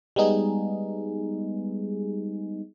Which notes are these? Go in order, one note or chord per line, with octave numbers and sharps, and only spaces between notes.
G3 G#3 B3 D#4 G#4